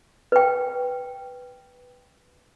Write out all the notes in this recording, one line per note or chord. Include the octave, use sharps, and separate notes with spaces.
B4 G5